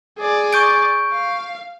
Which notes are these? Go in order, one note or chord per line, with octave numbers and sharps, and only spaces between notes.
G#4 D5
C#6 G6 D7
F5